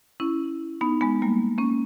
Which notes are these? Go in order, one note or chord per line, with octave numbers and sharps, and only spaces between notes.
C#4 E4
B3 D#4
G#3 B3
G3 A#3
A#3 C#4